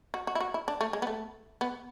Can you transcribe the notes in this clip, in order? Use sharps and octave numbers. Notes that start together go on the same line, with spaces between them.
F#4
F#4
E4
F#4
E4
D4
A3
G#3
B3
A3
B3